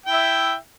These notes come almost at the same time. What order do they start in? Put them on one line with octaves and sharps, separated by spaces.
G5 E4 E5